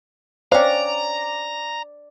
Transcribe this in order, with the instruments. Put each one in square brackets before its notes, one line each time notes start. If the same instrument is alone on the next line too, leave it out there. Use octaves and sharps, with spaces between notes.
[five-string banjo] C#4 F5 [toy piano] C5 G5 [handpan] D5 [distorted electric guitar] A#5